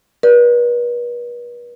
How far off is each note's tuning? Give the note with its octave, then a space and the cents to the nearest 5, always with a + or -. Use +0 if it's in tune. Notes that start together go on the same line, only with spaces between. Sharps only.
B4 -40 D5 +0